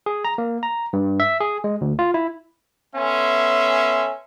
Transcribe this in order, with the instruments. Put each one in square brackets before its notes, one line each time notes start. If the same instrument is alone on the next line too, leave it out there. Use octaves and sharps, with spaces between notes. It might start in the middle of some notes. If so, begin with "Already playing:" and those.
[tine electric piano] G#4
A#5
A#3
A#5
G2
E5
G#4
G#3
D2
F4
E4
[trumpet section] B3 C#4 A4 E5 G#5 C6